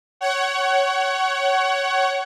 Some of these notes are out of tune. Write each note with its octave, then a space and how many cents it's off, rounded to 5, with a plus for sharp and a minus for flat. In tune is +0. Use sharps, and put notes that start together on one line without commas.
C#5 +0 F#5 +30